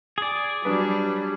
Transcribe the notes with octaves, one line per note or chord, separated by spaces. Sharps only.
G#4 D5
F#3 G3 D4 B4